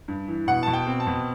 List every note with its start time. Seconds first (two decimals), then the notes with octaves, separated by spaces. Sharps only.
0.08 G2
0.28 E3
0.47 B2 F#5
0.63 B2 A5
0.73 G5
0.87 C4
1.00 A5
1.07 B2